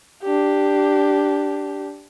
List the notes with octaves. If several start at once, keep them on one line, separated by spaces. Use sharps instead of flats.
D4 G4